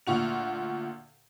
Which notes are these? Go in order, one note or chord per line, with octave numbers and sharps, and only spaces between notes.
D2 A#2 F#4 F7